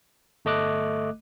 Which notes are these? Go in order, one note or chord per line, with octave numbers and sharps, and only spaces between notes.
G1 A3 D#5 D6 F#6